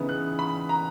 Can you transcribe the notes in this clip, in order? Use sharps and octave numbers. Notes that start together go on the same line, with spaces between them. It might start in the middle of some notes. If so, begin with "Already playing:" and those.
Already playing: C#3 E3 B3 D#4
F#6
B5
A#5